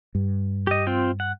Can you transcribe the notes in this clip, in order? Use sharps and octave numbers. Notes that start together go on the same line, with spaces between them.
G2
G4 D#5
C4 F4 G5
F#5